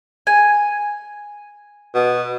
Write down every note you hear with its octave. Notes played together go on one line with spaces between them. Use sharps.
G#5
B2